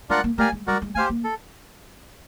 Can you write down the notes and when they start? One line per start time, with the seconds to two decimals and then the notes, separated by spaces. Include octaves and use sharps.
0.09 G#3 D4 F4 A#4 D5 F#5
0.24 A#3
0.38 A3 G4 A#4 D5 F5 G#5
0.52 G#3
0.67 G3 F#4 A#4 D5
0.82 G#3
0.95 A3 G4 C5 F5 G#5
1.10 A#3
1.24 A4